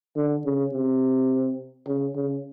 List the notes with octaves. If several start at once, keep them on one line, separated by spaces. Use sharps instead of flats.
D3
C#3
C3
C#3
C#3